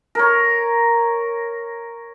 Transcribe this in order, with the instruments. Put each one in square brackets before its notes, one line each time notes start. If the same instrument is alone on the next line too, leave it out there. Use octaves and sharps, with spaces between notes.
[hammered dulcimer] A#4 C#5